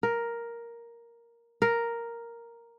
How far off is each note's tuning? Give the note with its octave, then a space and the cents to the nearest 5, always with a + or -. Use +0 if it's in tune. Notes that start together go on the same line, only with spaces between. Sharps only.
A#4 +5
A#4 +0